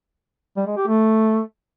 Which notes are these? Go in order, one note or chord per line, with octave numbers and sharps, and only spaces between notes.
G3
G#3
G4
A3